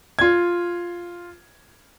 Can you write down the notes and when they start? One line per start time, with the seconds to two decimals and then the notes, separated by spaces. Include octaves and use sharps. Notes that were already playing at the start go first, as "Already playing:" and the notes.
0.19 F4 G#6